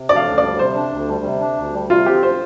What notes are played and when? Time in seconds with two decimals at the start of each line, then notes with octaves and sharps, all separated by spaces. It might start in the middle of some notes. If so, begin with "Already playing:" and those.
Already playing: C3
0.09 D4 D5
0.16 F5
0.27 D2
0.38 D5
0.43 G3
0.59 C3 C5
0.75 D4
0.92 D2
1.08 G3
1.25 C3
1.41 D4
1.57 D2
1.73 G3
1.90 C3 F4
2.06 C4 G4
2.23 C5